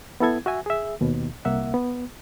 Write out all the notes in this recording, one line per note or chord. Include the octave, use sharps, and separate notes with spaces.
B3 E4 A4 G#6
F#4 E5 G#5
G#4 E5
D#2 B2
C2 A#3 E5 F#5
B3